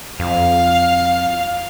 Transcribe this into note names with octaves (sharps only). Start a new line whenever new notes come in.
F2 F5